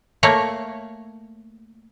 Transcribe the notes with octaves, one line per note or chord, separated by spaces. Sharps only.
A3 A#3 C#5